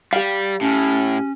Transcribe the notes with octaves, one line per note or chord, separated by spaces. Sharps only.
G3 G4 F5
A2 C#4